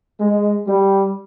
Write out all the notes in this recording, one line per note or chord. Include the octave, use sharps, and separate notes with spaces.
G#3
G3